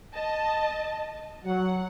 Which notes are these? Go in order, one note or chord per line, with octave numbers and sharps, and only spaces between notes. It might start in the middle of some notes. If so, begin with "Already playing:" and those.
D#5 A5
F#3 F#5